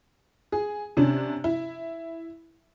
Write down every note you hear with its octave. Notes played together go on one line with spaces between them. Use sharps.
G#4
C3 C#4 D4
E4